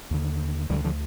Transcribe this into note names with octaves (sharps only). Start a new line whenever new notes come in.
D#2 D3
D2 D3 D#3 G3
D3 F3